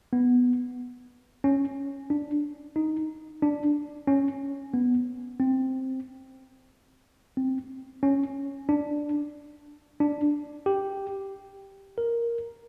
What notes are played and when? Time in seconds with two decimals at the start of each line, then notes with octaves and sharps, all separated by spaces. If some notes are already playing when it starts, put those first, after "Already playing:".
0.13 B3
1.44 C#4
2.10 D4
2.76 D#4
3.42 D4
4.07 C#4
4.74 B3
5.40 C4
7.37 C4
8.03 C#4
8.69 D4
10.00 D4
10.66 G4
11.98 A#4